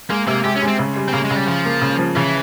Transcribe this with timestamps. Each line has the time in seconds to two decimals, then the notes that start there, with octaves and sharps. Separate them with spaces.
0.10 G#3 A#3
0.27 C3 A#3
0.44 G#3 G4
0.56 C#4
0.62 G#3
0.68 C4
0.79 C#3
0.96 G3
1.08 C4
1.13 C#3 A#3
1.25 G#3
1.31 C#3
1.36 G3
1.47 C#3 F3
1.65 A#3
1.82 C#3
1.99 F3
2.16 C#3 E3